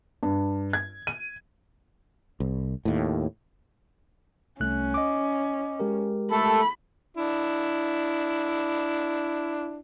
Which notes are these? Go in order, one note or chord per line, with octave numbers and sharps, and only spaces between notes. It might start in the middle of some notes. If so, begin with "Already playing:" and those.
G2
G#6
D#7
C2
D#2 A2
C2 A3 C#4 F#6
D#5 D6
G#3 G4 A#4
A3 A4 B5
D4 E4